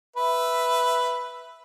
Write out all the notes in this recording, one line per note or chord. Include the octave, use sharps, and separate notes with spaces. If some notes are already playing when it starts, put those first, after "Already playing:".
B4 E5